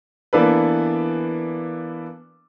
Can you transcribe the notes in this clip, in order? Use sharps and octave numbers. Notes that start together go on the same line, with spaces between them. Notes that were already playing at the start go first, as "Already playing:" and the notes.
E3 A#3 B3 D4 A4 B4